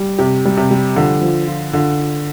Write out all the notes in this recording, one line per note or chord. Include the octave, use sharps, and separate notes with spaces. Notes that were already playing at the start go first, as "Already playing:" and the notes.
Already playing: G3
C3 G4
G3
C3
G3
D3 F3
F3
F4
D3 F4
F4